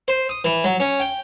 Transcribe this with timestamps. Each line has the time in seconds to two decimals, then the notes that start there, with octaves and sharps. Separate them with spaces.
0.08 C5
0.29 D#6
0.44 E3
0.64 F#3
0.80 C#4
1.00 G5